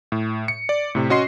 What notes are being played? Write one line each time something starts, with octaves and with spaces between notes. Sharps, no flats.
A2
C#7
D5
A2 C3
C#4 F#4 D#5 C6 C7